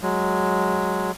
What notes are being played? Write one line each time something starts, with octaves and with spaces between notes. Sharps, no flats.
F#3 G#3